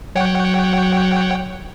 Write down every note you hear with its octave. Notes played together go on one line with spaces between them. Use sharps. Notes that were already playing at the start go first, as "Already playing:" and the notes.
F#3 C#5 F#5 G5